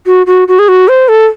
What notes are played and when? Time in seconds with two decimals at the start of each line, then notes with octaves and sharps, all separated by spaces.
0.06 F#4
0.27 F#4
0.48 F#4
0.59 G#4
0.68 F#4
0.88 C5
1.08 A4